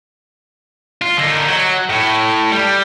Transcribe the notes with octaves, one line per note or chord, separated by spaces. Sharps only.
F4
D3 D#4
F#3
A2
G3